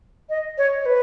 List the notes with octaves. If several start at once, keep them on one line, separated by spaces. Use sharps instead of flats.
D#5
C#5
C#5
B4